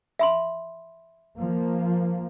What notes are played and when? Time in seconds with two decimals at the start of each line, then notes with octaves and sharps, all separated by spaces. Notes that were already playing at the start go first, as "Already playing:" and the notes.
0.19 E5 B5 C6
1.39 F3 A#3